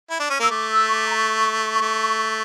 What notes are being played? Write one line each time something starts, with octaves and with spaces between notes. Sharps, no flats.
E4
D4
C#4
A#3 E6
A3 D6
E6
C#6
D6
A#5
C#6
A3